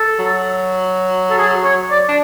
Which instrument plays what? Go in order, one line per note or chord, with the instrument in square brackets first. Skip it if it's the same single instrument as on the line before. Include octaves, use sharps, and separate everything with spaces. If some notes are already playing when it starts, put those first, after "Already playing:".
Already playing: [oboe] A4
[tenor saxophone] F#3
[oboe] A4
G#4
C#5
D5
[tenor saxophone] D4